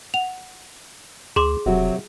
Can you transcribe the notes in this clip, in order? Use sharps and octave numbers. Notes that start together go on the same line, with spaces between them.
F#5 F7
D2 G#4 C6 D6
E1 C3 F#3 F#4